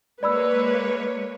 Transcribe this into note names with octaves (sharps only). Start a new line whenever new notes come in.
G#3 A#3 B4 C#5 D5 B5 E6